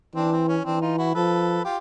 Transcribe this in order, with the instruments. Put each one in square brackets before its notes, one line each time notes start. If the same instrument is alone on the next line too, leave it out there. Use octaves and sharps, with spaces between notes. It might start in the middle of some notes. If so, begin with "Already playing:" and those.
[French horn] E3 [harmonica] C4 D4
[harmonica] C4
C#4
[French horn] E3 [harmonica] C4 D4
[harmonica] D#4 F4
E4 F#4
[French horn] F3 [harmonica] A4 B4
[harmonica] F4 G4